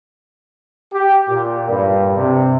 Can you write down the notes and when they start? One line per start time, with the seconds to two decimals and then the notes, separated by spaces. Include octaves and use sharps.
0.94 G4
1.30 A#2
1.70 G2
2.17 C3